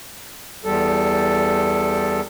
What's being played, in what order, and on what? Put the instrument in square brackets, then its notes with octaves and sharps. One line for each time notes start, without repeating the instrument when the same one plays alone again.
[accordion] E2 G3 A4